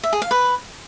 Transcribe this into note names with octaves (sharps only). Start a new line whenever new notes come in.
E5
G#4
F5
B4